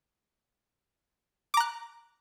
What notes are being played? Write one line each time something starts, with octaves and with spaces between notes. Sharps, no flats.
A#5 D6 F#6